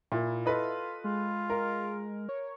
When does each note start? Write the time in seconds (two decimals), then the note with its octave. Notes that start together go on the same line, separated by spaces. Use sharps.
0.12 A#2 E4
0.46 F4 A4 B4 D#5
1.04 G#3 F4
1.50 A#4
2.29 C#5